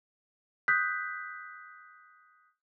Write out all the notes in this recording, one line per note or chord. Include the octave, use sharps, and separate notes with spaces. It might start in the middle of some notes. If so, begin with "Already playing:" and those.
D#6 F#6 G6 B6